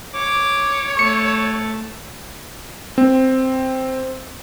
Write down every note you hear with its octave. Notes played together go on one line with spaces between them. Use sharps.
C#5 D6
A3 A5 C#6 C#7
C4